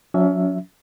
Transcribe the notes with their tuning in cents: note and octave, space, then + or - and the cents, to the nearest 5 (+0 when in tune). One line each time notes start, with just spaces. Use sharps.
F#3 -35 C#4 +35 E5 +0